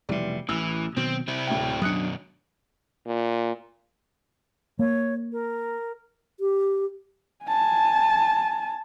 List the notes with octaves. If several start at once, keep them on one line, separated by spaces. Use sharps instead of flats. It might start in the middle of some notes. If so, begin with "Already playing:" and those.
F1 B2 E3 G3
A1 E3 E6
B2 D#3 F#3 C4
C3 C4 E4
D1 A2 G5
F#2 B2 F#3 D4 D#6 F#6 C#7
A#2
A#3 C#5
A#4
G4
G#5 A5